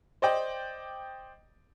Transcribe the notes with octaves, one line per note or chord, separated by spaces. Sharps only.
C5 D5 D#5 G5